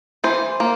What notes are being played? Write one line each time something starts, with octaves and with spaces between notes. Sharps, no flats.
E3 C5
A#3